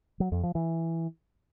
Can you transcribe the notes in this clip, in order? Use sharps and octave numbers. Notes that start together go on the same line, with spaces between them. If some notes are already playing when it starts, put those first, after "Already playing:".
F#3
F2
F3
E3